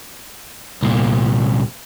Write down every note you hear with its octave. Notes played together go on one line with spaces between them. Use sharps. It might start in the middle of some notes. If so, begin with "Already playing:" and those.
C2 A#2